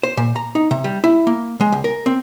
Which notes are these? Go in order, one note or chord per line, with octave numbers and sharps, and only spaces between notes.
C5
A#2
A#5
D#4
C3
G3
E4
A#3
G#3
C#2
A#4
C4